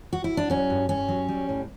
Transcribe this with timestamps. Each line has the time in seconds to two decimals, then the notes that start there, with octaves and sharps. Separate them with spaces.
0.13 F#4
0.24 E4
0.37 D4
0.50 F#3 C#4
0.70 G2
0.89 G2 C#4
1.08 F#3
1.29 G3
1.49 A2